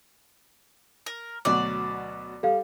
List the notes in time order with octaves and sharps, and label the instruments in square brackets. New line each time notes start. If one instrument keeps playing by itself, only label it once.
[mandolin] A#4
[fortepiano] D2 B2 F#3 [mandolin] D5
[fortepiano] G3 [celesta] A4 F5